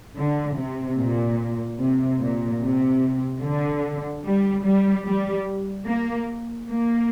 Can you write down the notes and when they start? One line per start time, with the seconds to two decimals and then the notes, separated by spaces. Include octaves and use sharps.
0.17 D3
0.57 C3
0.98 A#2
1.80 C3
2.21 A#2
2.62 C3
3.42 D3
4.24 G3
4.64 G3
5.05 G3
5.87 A#3
6.69 A#3